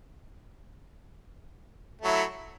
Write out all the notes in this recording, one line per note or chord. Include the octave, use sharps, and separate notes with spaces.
F#3 A3 E4